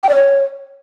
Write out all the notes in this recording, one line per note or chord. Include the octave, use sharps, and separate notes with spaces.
G5
D5
C#5